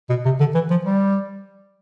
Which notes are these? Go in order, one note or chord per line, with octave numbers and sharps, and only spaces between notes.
B2
C3
D3
E3
F3
G3